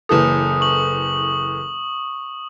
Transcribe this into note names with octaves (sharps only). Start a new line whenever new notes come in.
F#1 E3 A4 D#6
C#6 F#7